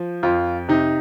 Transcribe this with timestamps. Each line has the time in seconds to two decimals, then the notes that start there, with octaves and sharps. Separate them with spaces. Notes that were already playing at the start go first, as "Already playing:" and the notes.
Already playing: F3
0.23 F2 F4
0.68 C3 D#4